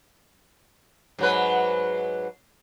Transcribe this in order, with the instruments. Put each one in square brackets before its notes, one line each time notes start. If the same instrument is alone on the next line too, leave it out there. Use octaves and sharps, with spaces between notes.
[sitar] G#2 F#3 B4